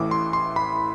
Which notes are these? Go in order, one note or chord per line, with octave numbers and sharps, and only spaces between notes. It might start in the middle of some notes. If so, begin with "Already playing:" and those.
Already playing: A1 A2 E3 D6
C6
C6
B5